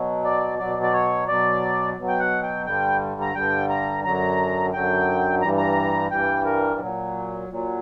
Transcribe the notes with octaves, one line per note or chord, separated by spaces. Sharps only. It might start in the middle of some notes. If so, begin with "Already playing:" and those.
Already playing: B2 F#3
D5
B2 F#3 D5
D5
C#5
B2 F#3 D5
B2 F#3
G5
F#5
G5
G2 D3 G3 G5
A#5
G2 D3 G3 G5
A#5
F#2 D3 F#3 A#5
F#2 D3 F#3 G5
G2 E3 G3 A#5
A#5
G2 E3 G3 G5
A#4
A#2 F#3
A#2 F#3